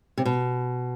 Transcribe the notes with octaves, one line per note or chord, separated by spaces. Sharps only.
C3
B2